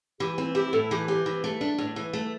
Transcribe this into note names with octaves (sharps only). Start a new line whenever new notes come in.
E3 G4
C4 E4
E4 G4
A2 A4
E3 G4
C4 G4
E3
A3
D4
A2
E3
A3